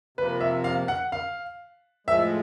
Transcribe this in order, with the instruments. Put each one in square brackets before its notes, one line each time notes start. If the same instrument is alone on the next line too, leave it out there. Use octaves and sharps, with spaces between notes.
[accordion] C3 F3 A#3 [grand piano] B4
[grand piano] E5
F5
F#5
F5
[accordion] A2 F3 G#3 [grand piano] E5